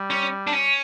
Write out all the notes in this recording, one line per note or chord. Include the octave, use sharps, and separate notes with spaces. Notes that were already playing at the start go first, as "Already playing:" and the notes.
Already playing: G3
C#4
D4
C#4